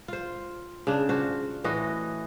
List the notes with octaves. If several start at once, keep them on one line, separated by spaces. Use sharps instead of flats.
F4 C5
C#3 D4
F4 F#4 C5
A2 E3 F#4 D#5